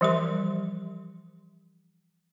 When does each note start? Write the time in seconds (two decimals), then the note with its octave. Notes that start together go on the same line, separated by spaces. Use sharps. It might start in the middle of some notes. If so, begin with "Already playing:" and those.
0.01 E3 F3 G3 G4 A#4 C6